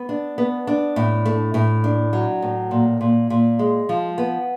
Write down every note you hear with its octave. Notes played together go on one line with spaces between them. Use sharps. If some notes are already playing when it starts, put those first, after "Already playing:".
Already playing: B3
D4
B3
D4
A2
A3
A2
D4
F#3
A2
A#2
A#2
A#2
G#3
F3
B3